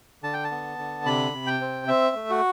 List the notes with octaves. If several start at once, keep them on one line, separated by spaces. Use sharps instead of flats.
D3 A5
G5
A5
B3
D3
C3 B5
C3
G5
C4
C4 E5
A3
F#4